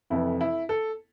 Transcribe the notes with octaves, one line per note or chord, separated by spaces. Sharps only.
F1 F2 E3 E4
E4
A4